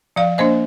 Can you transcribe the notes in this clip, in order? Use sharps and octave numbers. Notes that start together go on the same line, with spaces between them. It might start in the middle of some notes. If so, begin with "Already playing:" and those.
F3 D5 F5
A#3 D4 C5 D#5